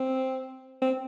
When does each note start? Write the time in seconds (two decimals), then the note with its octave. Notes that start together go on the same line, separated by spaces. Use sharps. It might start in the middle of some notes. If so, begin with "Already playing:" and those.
Already playing: C4
0.82 C4